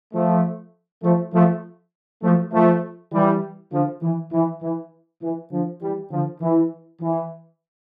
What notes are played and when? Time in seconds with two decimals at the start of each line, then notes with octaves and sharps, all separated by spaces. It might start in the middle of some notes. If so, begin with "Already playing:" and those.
0.14 F3 A3
1.03 F3 A3
1.33 F3 A3
2.23 F3 A3
2.53 F3 A3
3.13 E3 G3
3.72 D3 F3
4.03 E3
4.33 E3
4.62 E3
5.22 E3
5.52 D3 F3
5.82 E3 G3
6.12 D3 F3
6.41 E3
7.02 E3